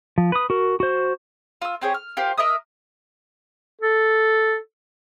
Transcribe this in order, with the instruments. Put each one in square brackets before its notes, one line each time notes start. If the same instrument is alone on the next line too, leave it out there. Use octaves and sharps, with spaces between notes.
[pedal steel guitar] F3
B4 D#6
F#4 A#4
F#4 C5
[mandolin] F4 E6
C4 G4 G#4 C#5
F6
F4 G4 A#4 C5
A#4 D#5 E5 D#6
[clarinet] A4